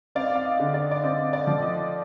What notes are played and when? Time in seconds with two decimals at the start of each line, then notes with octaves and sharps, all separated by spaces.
0.15 C4 D5 F5
0.36 F5
0.45 D#5
0.60 D3
0.74 D5
0.91 D5
1.04 C4 D#5
1.33 D5
1.47 F3
1.62 D#5